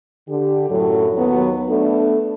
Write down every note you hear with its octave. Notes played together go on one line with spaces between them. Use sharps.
D3 G4
F#2 A2 F#3 A4
D#2 F#3 B3
A3 B3 D4 A4